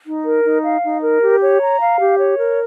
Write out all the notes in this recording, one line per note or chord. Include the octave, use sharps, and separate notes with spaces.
D#4
A#4
D#4
F5
D#4
A#4
G4
C#5
A#5
F5
G4
C#5
A#4